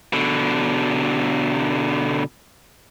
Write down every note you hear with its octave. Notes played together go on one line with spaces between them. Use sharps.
B2 D3